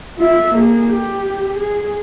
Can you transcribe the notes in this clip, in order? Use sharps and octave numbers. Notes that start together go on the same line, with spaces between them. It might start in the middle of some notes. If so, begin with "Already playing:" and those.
F4 E5
A#3 G#4
G4
G#4